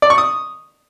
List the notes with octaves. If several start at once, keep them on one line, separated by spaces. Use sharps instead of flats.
D5
C#6
D#6